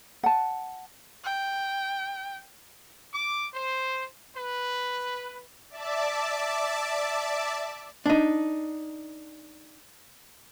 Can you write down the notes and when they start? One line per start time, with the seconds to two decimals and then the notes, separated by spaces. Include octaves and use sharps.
0.24 F#5 A5
1.24 G5
3.13 D6
3.54 C5
4.35 B4
5.70 D5 E5 A5 D6
8.06 D4 D#4